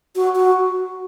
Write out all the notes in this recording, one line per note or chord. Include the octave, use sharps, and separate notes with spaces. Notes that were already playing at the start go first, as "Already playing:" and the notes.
F#4
F#4